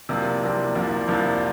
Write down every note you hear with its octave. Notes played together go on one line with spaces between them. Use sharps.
C2 C3 F3 A#3 D4
C2 C3 F3 A#3 D4
C2 C3 F3 A#3 D4
C2 C3 F3 A#3 D4